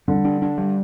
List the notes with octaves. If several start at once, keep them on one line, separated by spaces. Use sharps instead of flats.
D3 G3
D4
D4
G3